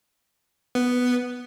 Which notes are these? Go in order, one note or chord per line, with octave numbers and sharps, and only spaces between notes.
B3